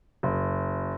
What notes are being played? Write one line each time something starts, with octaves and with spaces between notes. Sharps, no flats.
F#1